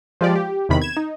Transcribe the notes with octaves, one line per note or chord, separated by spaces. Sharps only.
F3 G#3 F4 G4 D5
G4
E2 C3 D#3 B5
G#6 E7
D#4